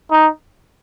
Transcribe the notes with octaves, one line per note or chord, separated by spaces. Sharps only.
D#4